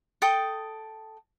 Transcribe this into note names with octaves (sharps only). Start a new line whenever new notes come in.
A4 G5 D#6